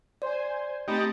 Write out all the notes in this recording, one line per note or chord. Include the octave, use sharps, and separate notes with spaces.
C5 D5 G#5
A3 C4 D#4 G4 B5 A6